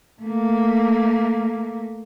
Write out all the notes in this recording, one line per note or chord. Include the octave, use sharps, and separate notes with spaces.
A3 A#3